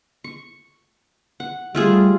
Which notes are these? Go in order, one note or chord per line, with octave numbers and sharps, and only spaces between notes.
C#6
F#5
G3 A3 F4 G#4